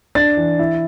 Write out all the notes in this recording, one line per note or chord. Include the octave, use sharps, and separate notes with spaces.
D4 A6
E3
E4